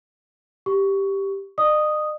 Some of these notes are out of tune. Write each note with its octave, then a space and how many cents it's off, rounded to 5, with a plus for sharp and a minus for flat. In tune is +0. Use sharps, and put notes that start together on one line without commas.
G4 +0 C#6 +10
D#5 -45 D#6 +0